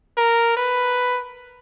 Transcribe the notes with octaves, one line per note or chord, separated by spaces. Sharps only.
A#4
B4